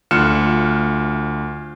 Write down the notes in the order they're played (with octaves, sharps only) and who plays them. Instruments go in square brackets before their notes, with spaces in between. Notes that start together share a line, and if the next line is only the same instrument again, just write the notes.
[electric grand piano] D2 F4 F6 F#6 C#7 E7